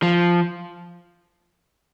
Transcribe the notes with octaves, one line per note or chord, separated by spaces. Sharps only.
F3